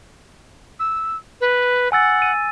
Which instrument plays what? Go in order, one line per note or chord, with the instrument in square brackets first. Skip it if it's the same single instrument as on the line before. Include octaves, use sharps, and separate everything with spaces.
[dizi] E6
B4
[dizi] F#5 [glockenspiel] G#5 E6 A6
[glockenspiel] D#7